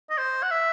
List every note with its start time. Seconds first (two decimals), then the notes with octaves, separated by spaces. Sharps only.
0.10 D#5
0.18 C5
0.43 F#5
0.51 E5